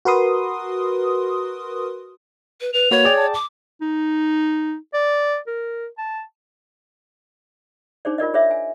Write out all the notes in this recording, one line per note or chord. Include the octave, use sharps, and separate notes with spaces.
F#4 A#4 B4 C6 D#6
B4
B4 F7
A#3 F#4 B4 C#5
G#4 D5 G5
A5
D6
D#4
D5
A#4
A5
D4 D#4 G#4 C5 D5
F4 A#4 D5 D#5
G#4 C#5 D5 E5
G#5